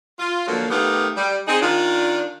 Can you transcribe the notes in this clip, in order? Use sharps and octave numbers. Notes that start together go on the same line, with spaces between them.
F4
D3 F3 F#3 A#3
D#3 A3 B3 D#4 G4 F5
G3
C4 D#4 G#4
D#3 D4 F4